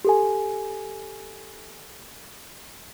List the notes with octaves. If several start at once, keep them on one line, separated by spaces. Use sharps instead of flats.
G4 A4 G#5